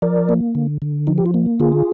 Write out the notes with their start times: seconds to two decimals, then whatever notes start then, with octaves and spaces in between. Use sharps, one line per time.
0.02 F3 A#4 D5
0.29 A#3
0.55 D3
0.82 D3
1.07 F3 D#4
1.18 G4
1.26 F4
1.34 A#3
1.60 D3 F4 G#4